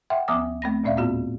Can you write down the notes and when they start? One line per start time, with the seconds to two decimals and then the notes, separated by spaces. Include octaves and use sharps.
0.10 E5 F#5 G5 C6
0.28 D2 F3 B3 G#5 D6 D#6
0.62 A3 C4 A#6
0.84 D#2 A#2 C#4 D5 E5 F5
0.97 A2 B3 C4 F4 F#4